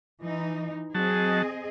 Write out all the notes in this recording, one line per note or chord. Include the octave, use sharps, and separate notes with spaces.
E3 D#4
F#3 C4 G#4 D#5 A5